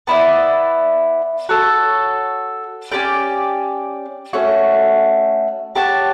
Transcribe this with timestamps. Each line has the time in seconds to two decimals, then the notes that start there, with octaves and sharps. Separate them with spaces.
0.07 B3 E4 B4 D5
1.49 F#4 A4 C#5
2.92 C#4 G4 D5 G5
4.33 A3 C#4 F#4
5.75 G4 C#5 F#5 A5